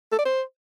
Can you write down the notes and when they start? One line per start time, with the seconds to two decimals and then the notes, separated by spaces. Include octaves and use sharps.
0.12 A4
0.19 D5
0.26 C5